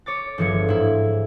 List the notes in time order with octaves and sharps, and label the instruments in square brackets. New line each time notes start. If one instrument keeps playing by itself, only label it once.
[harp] C#5 D6 A6
G1 E3 F3 G#3 G#6 C#7
G#2 E4